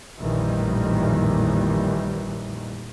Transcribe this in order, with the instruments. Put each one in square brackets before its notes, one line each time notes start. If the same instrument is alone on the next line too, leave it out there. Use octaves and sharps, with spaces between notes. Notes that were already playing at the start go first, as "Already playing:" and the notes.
[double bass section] A#1 F2 A2 D#3 E3 G3